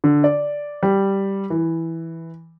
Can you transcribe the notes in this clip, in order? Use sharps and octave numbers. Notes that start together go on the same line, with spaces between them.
D3
D5
G3
E3